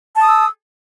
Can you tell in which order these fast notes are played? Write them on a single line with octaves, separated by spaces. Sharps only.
A5 D#6 E6